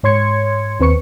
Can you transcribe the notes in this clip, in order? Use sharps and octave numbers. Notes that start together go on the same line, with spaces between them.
G#2 C#5 C6 G#6 C#7
D#2 C4 B4 C#6 C#7